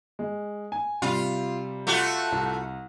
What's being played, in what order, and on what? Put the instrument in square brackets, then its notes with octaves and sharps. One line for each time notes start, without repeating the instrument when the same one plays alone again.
[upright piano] G#3
G#5
[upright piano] C3 G3 [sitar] F4
[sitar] A3 F4 F#4
[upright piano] C2